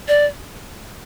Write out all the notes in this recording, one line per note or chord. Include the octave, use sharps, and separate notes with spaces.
D5